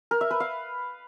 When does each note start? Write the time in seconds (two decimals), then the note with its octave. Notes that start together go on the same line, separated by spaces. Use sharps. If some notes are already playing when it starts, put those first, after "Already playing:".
0.11 A#4
0.21 E5
0.31 B4
0.40 F5